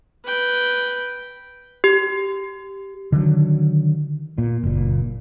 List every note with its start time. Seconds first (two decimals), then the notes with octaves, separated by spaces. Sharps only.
0.25 B4 G5
1.84 G4
3.12 D3 D#3 F#3
4.38 A#2
4.63 F#1 A#2